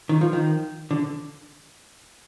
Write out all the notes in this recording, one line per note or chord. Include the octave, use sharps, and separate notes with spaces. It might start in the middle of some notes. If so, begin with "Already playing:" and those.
D#3
F3
D#3
D3